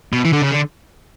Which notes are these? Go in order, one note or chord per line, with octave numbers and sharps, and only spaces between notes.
B2
E3
D3
C#3
D3